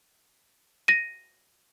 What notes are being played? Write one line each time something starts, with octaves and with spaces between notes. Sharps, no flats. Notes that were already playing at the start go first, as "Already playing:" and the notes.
A#6 D#7